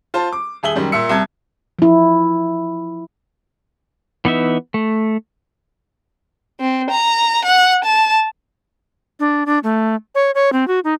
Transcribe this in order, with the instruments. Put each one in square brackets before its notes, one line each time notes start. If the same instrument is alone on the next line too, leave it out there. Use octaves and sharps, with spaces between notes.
[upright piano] F4 C5 A5
D6
D#1 G#4 E5 F#7 G7
F#2 D#3 G3
A#2 E5 E6 C#7
C2 E5 A5 G#6
[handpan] F3 E4
[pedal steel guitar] E3 B3 D#4 E5
A3
[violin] C4
A#5
F#5
A5
[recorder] D4
D4
A3
C#5
C#5
C4
F#4
D#4